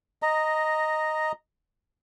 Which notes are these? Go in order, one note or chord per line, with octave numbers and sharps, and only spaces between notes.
D#5 A#5